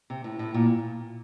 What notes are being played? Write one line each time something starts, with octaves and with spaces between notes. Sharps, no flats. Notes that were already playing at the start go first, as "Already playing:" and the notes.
C3
A2
A2
A#2